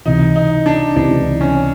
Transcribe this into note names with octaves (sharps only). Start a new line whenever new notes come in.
C#2 C3 E3 D#4
D#4
D4
C#2 C3 E3 D4
C#4